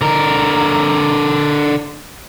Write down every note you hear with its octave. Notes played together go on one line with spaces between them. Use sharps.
D3 A#4